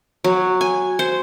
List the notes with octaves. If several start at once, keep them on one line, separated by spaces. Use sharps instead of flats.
F#3
G#5
C5